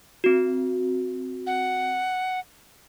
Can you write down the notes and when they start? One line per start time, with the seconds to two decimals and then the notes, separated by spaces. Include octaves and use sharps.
0.24 C4 F#4
1.47 F#5